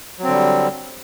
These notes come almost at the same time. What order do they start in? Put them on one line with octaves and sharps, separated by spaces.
F#3 C4 D3 G3